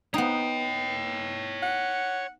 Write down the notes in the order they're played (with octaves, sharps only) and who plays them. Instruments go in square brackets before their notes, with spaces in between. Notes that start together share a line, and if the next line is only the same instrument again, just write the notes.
[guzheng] B3 D#4 [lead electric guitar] C#5 G5
[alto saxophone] F#5